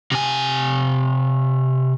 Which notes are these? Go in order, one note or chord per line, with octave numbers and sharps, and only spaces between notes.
C3 G#5